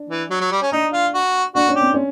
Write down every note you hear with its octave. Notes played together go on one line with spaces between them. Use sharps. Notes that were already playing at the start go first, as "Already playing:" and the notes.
Already playing: D4
E3
F#3
F#3
G3
C#4
D4 D#4
F4
F#4
D4 F#4
C#4
G4
C4
C#4